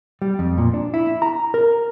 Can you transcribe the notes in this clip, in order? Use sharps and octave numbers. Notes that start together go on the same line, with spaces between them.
G3
F2
A#2
D4
E4
A#5
A#4